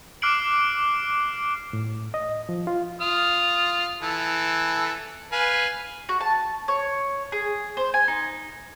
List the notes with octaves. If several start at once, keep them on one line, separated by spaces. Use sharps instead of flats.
D6 F6 F#6 C7 D7 F#7
A2
D#5
F3
F4
F4 D#6 F6
E3 A4
B4 F5 G#5
F#4
A5
C#5
G#4
C5
G#5
D#4